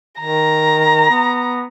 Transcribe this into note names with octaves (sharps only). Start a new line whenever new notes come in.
D#3 A#5
B3